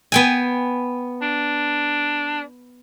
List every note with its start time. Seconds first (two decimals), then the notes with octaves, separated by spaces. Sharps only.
0.12 B3 G5 G#5
1.22 D4